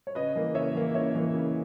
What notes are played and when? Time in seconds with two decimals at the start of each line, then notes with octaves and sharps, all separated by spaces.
0.07 C#5
0.15 C#3 B4 D#5
0.35 E3 A#3
0.54 C#3 C#5 E5
0.75 E3 A#3
0.94 C#3 C#5 E5
1.15 E3 A#3
1.34 C#3